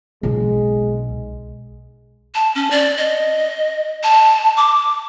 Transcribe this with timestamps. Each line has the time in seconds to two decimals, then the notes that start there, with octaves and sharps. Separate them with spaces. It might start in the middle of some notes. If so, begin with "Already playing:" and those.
0.23 B1 G#3
2.35 A5
2.55 C#4
2.71 D5
2.98 D#5
4.03 A5
4.57 D6